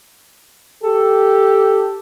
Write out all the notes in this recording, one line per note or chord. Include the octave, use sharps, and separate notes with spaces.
G4 A4